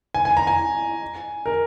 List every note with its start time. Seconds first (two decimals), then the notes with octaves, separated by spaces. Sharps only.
0.14 G#5
0.25 G#5
0.37 A#5
0.47 G#5
1.46 A#4